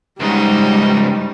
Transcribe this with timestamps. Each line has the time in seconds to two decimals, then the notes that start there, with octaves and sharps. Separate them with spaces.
0.20 C#2 G#2 G3 D#4 F#4